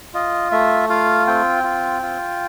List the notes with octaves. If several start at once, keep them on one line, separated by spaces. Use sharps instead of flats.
F4 D#5
A3 E5
F4 F5
C4 G5
F4
F4